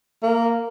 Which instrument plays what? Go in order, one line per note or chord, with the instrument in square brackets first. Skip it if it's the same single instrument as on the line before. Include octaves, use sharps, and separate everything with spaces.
[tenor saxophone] A#3